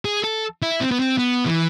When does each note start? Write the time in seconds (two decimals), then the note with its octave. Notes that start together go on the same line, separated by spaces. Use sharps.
0.05 G#4
0.24 A4
0.62 E4
0.81 C4
0.91 B3
1.00 C4
1.18 B3
1.46 E3